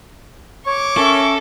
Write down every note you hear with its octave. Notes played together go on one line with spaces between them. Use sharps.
C#5 C#6 D6
C#4 A4 A#4 E5